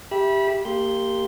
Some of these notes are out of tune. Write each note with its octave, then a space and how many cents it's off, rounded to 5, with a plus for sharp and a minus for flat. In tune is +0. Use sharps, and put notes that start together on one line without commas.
G4 +0 E5 +0 B5 -25
A#3 -25 G4 +0 C6 +0